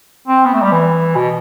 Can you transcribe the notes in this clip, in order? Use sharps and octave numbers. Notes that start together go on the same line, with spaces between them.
C4
B3
A3
G3
E3
B2